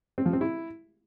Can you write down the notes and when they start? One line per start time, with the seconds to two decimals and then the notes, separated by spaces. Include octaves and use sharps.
0.18 C4
0.26 F3
0.33 C4
0.41 E4